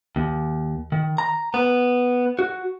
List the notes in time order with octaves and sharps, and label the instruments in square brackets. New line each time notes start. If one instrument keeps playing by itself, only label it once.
[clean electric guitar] D#2
D#3
A#5
B3
F#4